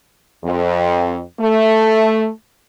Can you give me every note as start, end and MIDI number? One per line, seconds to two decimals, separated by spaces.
0.44 1.20 41
1.39 2.29 57